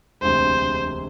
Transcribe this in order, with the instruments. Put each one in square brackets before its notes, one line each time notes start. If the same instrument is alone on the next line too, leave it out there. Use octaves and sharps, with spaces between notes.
[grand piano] E1 D2 C3 [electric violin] C5